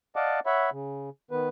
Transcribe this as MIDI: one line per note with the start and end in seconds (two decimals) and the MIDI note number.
0.16 0.40 74
0.16 0.40 75
0.16 0.40 77
0.16 0.40 78
0.16 0.40 81
0.16 0.40 86
0.46 0.70 73
0.46 0.70 76
0.46 0.70 78
0.46 0.70 83
0.72 1.10 49
1.31 1.49 51
1.31 1.49 59
1.31 1.49 71